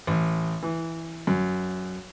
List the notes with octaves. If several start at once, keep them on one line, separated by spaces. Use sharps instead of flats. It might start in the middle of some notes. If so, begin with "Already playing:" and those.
A1
E3
F#2